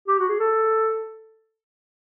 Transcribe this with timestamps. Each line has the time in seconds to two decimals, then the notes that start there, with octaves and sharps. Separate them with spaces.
0.08 G4
0.19 F#4
0.29 G#4
0.40 A4